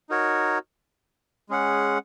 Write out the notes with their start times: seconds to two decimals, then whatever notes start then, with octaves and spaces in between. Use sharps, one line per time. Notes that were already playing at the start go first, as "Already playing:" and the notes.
0.09 D#4 F#4 A#4 C#5
1.49 G#3 C#4 G#4 F#5